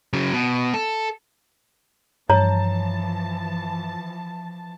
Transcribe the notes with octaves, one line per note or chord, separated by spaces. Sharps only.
C#3 F#3
B2
A4
G2 E3 F3 C#5 A5 A#5